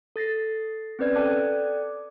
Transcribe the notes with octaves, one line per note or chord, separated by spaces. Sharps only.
A4 A6 A#6 C7
C4 C#4 B4 D5 G#6
A4 D5 G5 A5 D6 F#6